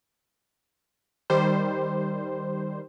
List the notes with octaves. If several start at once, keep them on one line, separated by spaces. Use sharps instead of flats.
D#3 G3 C5